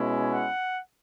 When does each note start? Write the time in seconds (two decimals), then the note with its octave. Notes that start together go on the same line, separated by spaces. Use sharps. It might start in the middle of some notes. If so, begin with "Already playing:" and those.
Already playing: B2 G#3 C#4 E4
0.28 F#5